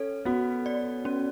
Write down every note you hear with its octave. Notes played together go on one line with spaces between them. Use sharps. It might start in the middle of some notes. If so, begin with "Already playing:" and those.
Already playing: C#4 A4
B3 F#4
D5
C#4